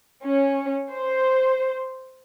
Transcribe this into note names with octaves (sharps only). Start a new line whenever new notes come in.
C#4
C5